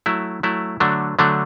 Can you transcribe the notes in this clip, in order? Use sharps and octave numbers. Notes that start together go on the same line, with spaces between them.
F#3 A3 E4
F#3 A3 E4
D3 F#3 A3 D4
D3 F#3 A3 D4